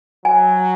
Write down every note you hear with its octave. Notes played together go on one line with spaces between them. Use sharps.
F#3 G#5